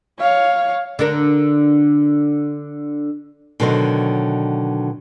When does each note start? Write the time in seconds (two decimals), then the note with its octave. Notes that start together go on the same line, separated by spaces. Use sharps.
0.19 C#5 F5
0.99 D3 D4 A#4
3.60 B2 D3 D#3 F#3 C5 D#5